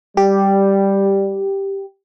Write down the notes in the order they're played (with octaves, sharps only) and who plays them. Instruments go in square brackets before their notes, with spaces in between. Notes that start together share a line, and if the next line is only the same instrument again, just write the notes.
[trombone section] G3 [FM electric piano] G4